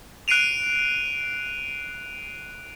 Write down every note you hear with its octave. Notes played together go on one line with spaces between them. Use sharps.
F#6 C7 D7 D#7 F7